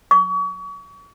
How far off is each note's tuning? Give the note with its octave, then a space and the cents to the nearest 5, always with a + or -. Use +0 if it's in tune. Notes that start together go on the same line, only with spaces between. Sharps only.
C#6 +35